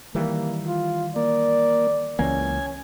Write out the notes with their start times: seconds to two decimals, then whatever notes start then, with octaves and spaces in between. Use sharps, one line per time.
0.15 D#3 E3 G3 A#3
0.67 F4
1.16 A#3 D5
2.19 C#2 E3 A#3 C#4 G#5